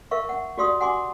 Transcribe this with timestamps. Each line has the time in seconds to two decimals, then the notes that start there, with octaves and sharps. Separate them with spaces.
0.11 A#4 E5 F5 C#6
0.29 F#5
0.58 F#4 G4 D5 F5 C6 D#6
0.81 F#5 G#5 C6 D6